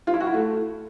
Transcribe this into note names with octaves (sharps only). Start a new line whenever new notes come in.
F4
E4
F#4
E4
A3